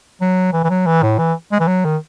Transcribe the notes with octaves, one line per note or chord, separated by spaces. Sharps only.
F#3
E3
E3
F#3
E3
A2
E3
G#3
E3
F#3
D#3